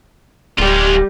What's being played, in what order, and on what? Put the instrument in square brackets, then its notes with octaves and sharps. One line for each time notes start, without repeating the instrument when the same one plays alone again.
[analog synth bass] D1 [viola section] G3 [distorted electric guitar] G#3 F4